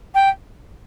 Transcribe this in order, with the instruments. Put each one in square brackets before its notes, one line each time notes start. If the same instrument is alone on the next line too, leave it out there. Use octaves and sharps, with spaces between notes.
[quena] G5